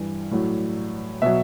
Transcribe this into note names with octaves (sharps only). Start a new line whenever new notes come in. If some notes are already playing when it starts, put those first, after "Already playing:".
Already playing: G2 E3 G3
A2 F#3
B2 F#3 E5